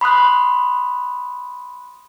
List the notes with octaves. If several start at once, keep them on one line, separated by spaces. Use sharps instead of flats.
B5 C6 D#6 F#6